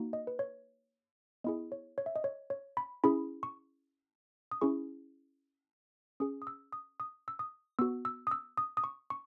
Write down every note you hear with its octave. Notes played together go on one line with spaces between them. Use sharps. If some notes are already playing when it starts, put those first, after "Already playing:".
Already playing: A#3 D#4 F#4
D#5
B4
C#5
B3 E4 G#4 D#5
C#5
C#5
E5
D#5
C#5
C#5
B5
C#4 E4 G#4 B5
C#6
D#6
C#4 E4 G#4 C#6
C#4 G#4 D#6
D#6
E6
D#6
D#6
E6
D#6
B3 F#4 E6
E6
D#6
E6
D#6
D#6
C#6
C#6